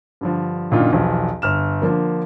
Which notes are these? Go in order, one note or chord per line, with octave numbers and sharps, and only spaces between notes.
G2 D3 F3
F#2 A#2 D3 D#3 D#4 F4
B1 E2 F3
G1 F6 E7
D3 F3 A#3